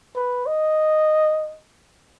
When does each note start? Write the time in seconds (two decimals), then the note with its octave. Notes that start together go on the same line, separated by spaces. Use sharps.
0.16 B4
0.47 D#5